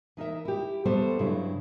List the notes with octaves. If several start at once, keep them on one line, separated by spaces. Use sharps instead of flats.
E3 D#4 A#4 E5
E4 G4
F3 G3 A3 B3 A4 C5
G2 C#3 F#3 E4